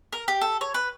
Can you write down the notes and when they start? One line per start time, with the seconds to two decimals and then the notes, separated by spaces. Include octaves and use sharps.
0.13 A#4
0.28 G4
0.41 A4
0.61 C#5
0.74 B4